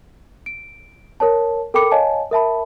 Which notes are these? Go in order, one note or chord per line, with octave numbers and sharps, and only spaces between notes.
D7
A#4 C#5 A5
A4 A#4 G5 B5 D6 C#7
C#5 D#5 F5 G#5 A5
A#4 E5 A5 B5